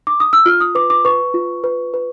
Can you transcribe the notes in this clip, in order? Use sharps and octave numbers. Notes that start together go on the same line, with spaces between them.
D6
D#6
E6
F4 F6
D#6
B4 D6
D6
B4 C#6
F4
B4
B4